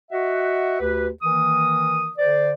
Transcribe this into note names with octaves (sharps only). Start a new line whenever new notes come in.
F#4 D#5 E5 F#5
D2 G4 B4
D#3 E3 A#3 A#4 D#6
D3 C5 D5